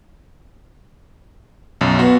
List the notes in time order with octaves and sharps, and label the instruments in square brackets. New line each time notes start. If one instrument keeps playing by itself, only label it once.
[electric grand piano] B1 F#2
[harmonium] B3 [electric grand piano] F#4